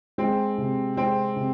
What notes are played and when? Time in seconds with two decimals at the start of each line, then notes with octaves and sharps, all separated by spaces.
0.18 G#3 C4
0.58 C3
0.97 G#3 C4
1.36 C3